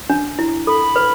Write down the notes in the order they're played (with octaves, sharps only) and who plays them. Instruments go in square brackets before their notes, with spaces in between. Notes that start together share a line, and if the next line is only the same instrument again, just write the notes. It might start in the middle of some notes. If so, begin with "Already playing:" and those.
[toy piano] D4
E4
[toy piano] A4 [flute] B5
[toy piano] B4